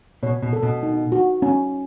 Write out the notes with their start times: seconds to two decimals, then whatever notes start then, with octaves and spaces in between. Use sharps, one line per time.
0.23 B2 C#5
0.42 B2
0.53 A4
0.63 B2
0.83 D#4
1.12 F#4
1.42 C#4